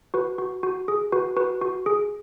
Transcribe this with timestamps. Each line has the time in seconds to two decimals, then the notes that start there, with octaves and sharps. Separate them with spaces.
0.14 F#4 B4
0.38 F#4
0.63 F#4
0.88 G#4
1.12 F#4 B4
1.36 F#4 B4
1.61 F#4
1.86 G#4